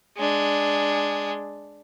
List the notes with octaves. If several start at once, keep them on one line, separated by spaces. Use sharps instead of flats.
G#3 D4